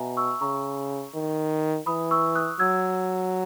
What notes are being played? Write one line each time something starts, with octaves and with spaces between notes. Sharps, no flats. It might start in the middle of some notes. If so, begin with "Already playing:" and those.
Already playing: B2 E5 G#5 A#5
C#6 E6
C#3 A#5 C#6
D#3
E3 B5 D#6
C#6 E6
D#6 F#6
F#3 E6 G#6